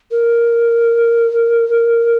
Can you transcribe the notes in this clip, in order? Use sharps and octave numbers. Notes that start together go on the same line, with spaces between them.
A#4